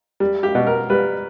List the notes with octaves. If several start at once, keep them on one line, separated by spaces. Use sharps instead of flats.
G3
G4
B2
A#4
G3 B4